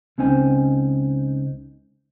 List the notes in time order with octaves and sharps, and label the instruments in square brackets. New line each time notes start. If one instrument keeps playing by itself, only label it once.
[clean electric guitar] C#2 C4 C#4 D#4 C5 G#5